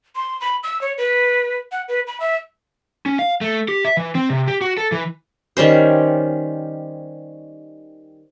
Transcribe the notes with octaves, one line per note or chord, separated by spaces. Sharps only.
C6
B5
E6
C#5
B4
F#5
B4
B5
E5
C#4
F5
A3
G4
E5
E3
C4
C3
G4
F#4
A4
E3
D#3 G3 C#4 C5